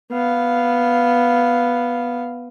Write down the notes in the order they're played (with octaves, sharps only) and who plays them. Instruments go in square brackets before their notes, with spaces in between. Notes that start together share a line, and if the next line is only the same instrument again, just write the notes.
[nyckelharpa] B3 F5